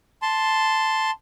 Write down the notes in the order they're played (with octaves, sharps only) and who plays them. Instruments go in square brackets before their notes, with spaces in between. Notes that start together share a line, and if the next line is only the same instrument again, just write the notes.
[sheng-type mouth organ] A5 C6